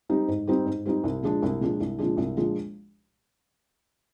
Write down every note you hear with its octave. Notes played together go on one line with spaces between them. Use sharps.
G3 C4 D#4
G#2
G3 C4 D#4
G#2
G3 C4 D#4
C2
A#2 F3 G#3 D4
C2
A#2 F3 G#3 D4
C2
A#2 F3 G#3 D4
C2
A#2 F3 G#3 D4